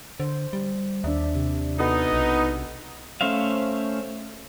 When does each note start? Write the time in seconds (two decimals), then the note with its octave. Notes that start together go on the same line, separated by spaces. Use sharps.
0.20 D3 C5
0.53 G3
1.04 D#2 D4 D5 E5
1.35 C3
1.79 B3 D#4 F#4 A4 D#5
2.13 B1
3.21 A3 C#4 C5 E5 F5